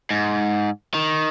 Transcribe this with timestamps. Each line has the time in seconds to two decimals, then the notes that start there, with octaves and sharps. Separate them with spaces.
0.10 G#2
0.94 D#3